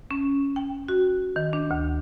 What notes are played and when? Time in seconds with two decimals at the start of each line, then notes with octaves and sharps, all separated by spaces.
0.11 C#4
0.56 G5
0.88 F#4
1.36 D#3
1.53 D4
1.71 D2